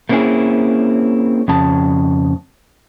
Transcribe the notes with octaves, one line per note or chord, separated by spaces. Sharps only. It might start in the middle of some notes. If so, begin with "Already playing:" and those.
A3 A#3 C4 C#4 E4 G#4
F2 C#3 A5